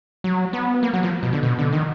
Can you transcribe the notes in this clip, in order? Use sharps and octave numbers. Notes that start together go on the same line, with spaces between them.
F#3
B3
A#3
F#3
F3
B2
D3
B2
D3
D#3